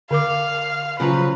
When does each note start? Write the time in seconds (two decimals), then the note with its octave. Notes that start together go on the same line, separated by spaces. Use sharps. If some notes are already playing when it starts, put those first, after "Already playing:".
0.11 D3 A#4 F5 D6
1.00 C#3 F3 F#3 B4